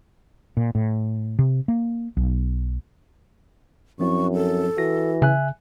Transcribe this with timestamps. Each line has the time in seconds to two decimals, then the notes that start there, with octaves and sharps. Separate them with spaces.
0.57 A#2
0.75 A2
1.39 C3
1.68 A#3
2.17 B1
4.00 F#2 F3 C4 E4 C#6
4.34 A4
4.78 E3 F#4 A#6
5.22 C#3 E5 G#5 F#6